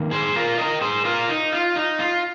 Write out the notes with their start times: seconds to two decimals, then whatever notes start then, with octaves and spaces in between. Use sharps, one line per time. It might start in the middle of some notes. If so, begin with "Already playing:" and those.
Already playing: G#2 D#3 A#3
0.11 G#4 C5
0.36 F4 A#4
0.58 A#4 D#5
0.81 G#4 C5
1.05 F4 A#4
1.29 D#4
1.52 F4
1.76 D#4
1.99 F4